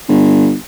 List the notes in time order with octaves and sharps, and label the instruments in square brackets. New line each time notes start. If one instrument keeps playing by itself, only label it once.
[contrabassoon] G1